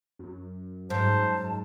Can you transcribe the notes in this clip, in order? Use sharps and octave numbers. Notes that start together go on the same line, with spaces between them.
F#2
G#2 C5 A5